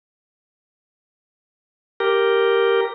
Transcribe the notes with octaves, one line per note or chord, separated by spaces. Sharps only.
G4 A#4